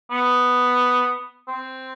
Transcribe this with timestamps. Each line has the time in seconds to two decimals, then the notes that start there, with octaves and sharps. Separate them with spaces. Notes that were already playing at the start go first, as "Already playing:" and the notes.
0.11 B3
1.48 C4